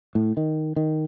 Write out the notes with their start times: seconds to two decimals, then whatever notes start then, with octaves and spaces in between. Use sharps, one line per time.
0.15 A2
0.37 D#3
0.76 D#3